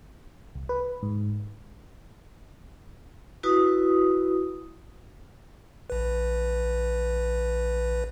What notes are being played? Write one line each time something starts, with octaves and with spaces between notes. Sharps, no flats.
C2
B4
G#2
E4 F#4 B4 D#6
A#1 B4